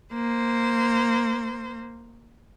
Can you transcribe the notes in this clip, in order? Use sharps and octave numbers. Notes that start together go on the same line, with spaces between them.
A#3 C5